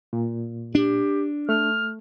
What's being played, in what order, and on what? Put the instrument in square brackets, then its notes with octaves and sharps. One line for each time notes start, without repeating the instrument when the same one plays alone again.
[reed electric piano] A#2
[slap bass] D4 [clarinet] G4
[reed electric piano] A3 [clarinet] F6